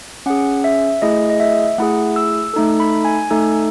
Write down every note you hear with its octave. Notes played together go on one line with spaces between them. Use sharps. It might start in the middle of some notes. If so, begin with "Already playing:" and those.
C#4 G#4 F#5
E5
A3 E4 G#4 D#5
D#5
E5
A3 E4 G#4 F#5
E6
A3 D#4 A4
B5
G#5
A3 D#4 A4